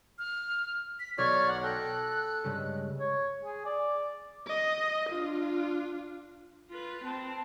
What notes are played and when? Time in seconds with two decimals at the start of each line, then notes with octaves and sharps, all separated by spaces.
0.18 F6
0.99 B6
1.18 B1 C#5 D5 F6 G#6
1.47 F#5
1.63 A4 G5 F#6 A#6
2.44 G2 C#3 G#3
3.00 C#5
3.45 G#4
3.65 D5
4.47 D#5
5.10 D4 F4
6.71 F4 B4
7.05 C4 A5